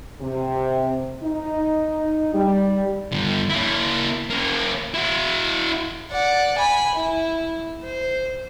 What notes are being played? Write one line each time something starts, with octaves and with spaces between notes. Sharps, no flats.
C3
D#4
G3
G2 D3
A#3 E4
A#3 C#4
E4 F#4
D5 F#5
G#5 B5
E4
C5